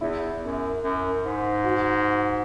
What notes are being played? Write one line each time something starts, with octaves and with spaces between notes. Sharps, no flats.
E2 E4
F#2
F#2
G#2
F#4